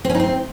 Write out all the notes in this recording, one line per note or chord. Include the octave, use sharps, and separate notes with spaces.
C4
C#4
D#4
C4